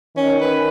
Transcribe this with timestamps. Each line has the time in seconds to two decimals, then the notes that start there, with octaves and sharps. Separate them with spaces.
0.16 D#3 C#4
0.41 B4